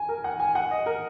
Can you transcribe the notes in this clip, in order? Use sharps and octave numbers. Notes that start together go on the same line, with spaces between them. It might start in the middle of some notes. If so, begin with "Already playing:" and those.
Already playing: G#5
A#4
F#5
G#5
F#5
D#5
A#4